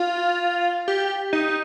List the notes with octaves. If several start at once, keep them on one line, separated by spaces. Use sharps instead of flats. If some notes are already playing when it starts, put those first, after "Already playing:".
Already playing: F4
G4
D#4